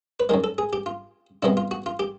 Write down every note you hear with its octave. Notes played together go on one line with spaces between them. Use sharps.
B4
F#2 D#3 G#3 A#4
A4
G#4
G4
F4
C2 B2 G#3 B3 E4
F4
F#4
F4
G4